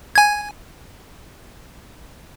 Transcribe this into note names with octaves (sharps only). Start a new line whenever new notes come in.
G#5 G#6